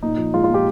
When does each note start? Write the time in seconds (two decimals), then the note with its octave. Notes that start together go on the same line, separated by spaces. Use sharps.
0.03 A#2 D#4
0.18 F3
0.33 G#3 F4
0.44 F4
0.50 A#2 G4